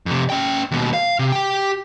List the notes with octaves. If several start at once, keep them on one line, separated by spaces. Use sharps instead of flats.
F2 C3
C#4 G5
D#2 B2
F5
C3
G4 G5